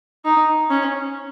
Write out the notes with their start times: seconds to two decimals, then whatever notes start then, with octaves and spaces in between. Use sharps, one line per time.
0.25 D#4
0.70 C#4